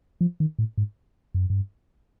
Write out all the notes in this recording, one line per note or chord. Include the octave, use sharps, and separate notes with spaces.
F3
D#3
A2
G#2
F#2
G2